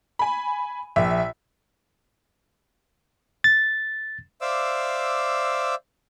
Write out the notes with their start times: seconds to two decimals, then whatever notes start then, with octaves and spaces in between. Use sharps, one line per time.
0.19 G#5 B5
0.96 A#1 E5
3.44 A6
4.41 C5 D5 E5 F5 D6 E6